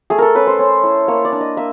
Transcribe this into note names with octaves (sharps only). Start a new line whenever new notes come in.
A3 G#4
A4 A#4
C#4 B4
C5
C#4
E4
A#3 C#5
D5
D4
D#5
A#3 E5